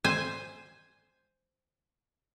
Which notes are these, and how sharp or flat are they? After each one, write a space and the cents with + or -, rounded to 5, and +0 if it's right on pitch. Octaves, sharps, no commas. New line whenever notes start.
C5 +0 G#5 +0